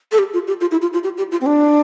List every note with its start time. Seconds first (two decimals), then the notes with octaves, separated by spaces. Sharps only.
0.12 A4
0.19 G4
0.33 F4
0.48 G4
0.61 F4
0.71 E4
0.82 F4
0.93 F4
1.04 G4
1.18 G4
1.32 F4
1.41 C4
1.46 D4